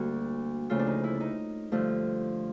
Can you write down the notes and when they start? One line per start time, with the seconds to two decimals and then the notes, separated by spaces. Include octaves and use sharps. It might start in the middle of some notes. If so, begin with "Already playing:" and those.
Already playing: D2 D3 G3 A#3 F#4
0.69 D2 C#3 F3 A3 F4
0.79 D4
0.87 D#4
1.04 E4
1.14 D4
1.20 D#4
1.72 G2 D3 F3 A3